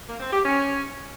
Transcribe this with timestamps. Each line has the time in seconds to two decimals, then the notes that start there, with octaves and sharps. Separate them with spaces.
0.08 A#3
0.20 C4
0.32 G4
0.44 C#4